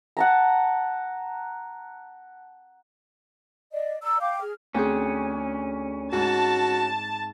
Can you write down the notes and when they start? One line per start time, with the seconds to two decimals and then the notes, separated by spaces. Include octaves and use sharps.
0.17 F#5 A5 A#5
3.72 D5 D#5
4.02 D5 A#5 E6
4.21 F5 G5 D6 G6
4.41 G#4 F6
4.75 D2 C4 C#4 G#4
6.12 G#2 F#4 A5